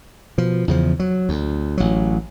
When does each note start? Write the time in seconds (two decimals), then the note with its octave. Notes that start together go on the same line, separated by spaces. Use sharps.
0.38 B2 F3
0.68 E2 C#3 F3
0.99 F#3
1.29 D2
1.77 A1 F#3